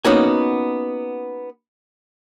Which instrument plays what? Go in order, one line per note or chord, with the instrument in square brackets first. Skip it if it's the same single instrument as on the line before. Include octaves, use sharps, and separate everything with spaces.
[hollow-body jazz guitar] A#3 B3 C#4 D#4 F#4 G#5